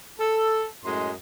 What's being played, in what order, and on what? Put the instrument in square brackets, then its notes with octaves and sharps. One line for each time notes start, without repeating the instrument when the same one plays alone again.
[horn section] A4
F#2 A2 G#3 D#5 C6